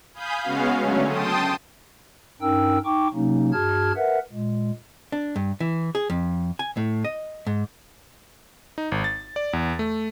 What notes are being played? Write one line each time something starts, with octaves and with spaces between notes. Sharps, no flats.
F5 G#5 B5 D#6 G6
C#3 G#3 B3 C#4 F#4 F5
D3 F#3 A3 C#4
G5 A5 C6 D#6
G2 C#4 D#4 A#4 G5 E6
D#4 G5 C#6 D6
C3 F#3 A#3 C#4 D#4
G2 F#4 G#4 A5 F6 G#6
A#4 B4 E5 F#5
A#2 G#3
D4
G2
E3
G#4
F2
G#5
A2
D#5
G#2
D#4
G#1
A6
D5
E2
A3